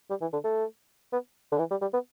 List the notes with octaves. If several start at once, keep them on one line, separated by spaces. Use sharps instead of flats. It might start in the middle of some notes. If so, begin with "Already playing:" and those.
G3
E3
D3
A3
B3
D3
E3
G3
G3
B3